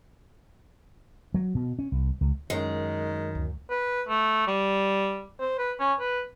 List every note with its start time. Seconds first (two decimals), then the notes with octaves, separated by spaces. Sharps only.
1.34 F#3
1.55 B2
1.79 C#4
1.92 C2
2.21 C#2
2.50 F#2 D#3 G#3
3.35 D2 B2
3.70 B4
4.09 A3
4.47 G3
5.40 C5
5.59 B4
5.80 C#4
6.00 B4